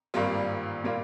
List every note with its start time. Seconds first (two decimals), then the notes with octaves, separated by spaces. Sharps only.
0.14 G#1 G2 G3 A#3 F4
0.84 A#2 G3 A#3 F4